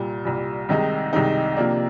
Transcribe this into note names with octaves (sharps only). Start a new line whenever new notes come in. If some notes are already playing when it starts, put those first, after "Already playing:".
Already playing: C2 A#2 G3
C2 A#2 G3
C2 C3 D#3 G#3 D#4
C2 C3 D#3 G#3 D#4
C3 F3 A#3 D4